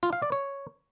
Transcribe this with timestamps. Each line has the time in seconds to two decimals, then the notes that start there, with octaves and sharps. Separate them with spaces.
0.03 F4
0.13 F5
0.22 D5
0.32 C#5